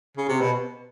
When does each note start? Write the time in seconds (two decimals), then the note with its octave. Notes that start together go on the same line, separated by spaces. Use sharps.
0.17 C#3
0.28 C3
0.41 B2